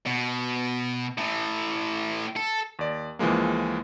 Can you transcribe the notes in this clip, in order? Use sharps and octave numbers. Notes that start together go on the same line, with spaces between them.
B2
A2 E3
A4
D#2 D5
C#2 E3 F3 G#3 A#3